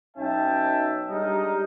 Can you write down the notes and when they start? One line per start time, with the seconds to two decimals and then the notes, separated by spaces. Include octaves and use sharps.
0.16 B1 C#4 D#4 E5 G5 A5
1.09 G3 G#3 D4 D#4 A#4 D#5